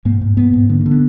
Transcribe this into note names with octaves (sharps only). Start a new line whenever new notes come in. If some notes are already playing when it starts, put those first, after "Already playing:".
G#2 A#3
G#2
G#2 B3
G#2
D3 B3
A#3
D3
B3